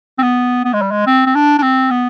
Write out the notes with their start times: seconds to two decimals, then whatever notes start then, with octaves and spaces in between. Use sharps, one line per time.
0.19 C4
0.23 B3
0.65 B3
0.73 G#3
0.82 G3
0.91 G#3
1.07 C4
1.26 C4
1.35 D4
1.58 D4
1.63 C4
1.91 B3